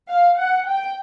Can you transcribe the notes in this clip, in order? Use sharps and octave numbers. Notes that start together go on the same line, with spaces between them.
F5
F#5
G5